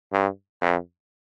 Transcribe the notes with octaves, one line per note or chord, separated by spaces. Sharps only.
G2
F2